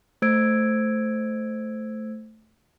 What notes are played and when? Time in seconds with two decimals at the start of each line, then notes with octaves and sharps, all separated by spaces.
0.22 A3 C5 E6 G#6 D7